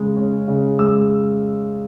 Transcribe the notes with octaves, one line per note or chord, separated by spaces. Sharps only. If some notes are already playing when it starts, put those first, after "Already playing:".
Already playing: C#3 G#3
C#4
C#3
G#3 E6